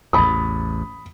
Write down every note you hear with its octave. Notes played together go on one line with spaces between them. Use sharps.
A1 E2 B5 D#6